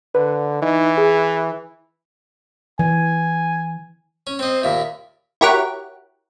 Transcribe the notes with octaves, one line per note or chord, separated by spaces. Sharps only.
D3 B4
E3 D#4
G#4
E3 G#5
C#4
C4 C5 D#5
D#2 A#2 E5
E4 F#4 G4 A#4 C#5 F#5